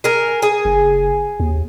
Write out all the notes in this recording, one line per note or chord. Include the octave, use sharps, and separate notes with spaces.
G#4 A#4
G#4
F#1
D#2